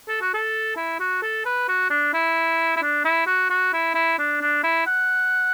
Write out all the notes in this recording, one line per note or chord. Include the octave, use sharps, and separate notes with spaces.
A4
F#4
A4
E4
F#4
A4
B4
F#4
D4
E4
E4
D4
E4
F#4
F#4
E4
E4
D4
D4
E4
F#5